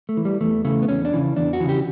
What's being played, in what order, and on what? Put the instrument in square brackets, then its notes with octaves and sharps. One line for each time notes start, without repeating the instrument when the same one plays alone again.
[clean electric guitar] A3
E3
G3
E2 A3
C#3 E3 A3
B3
E2 C#4
D4
C#3 E3
E2 D4
F#4
C#3 E3
G4